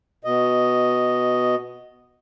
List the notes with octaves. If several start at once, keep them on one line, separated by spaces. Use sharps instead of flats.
B2 D#5